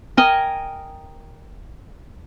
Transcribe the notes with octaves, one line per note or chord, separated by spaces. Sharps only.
A#4 D#5 G5 G#5